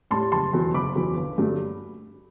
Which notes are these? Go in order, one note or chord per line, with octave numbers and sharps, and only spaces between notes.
A2 G3 A5 C6
F#1 A5 C6
E2 B2 F#3
F#1 B5 D6
E2 B2 F#3
G1
G2 F#3 A3